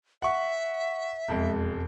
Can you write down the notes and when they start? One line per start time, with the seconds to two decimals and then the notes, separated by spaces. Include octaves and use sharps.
0.22 E5 F#5 C#6
1.28 E1 F2 G#3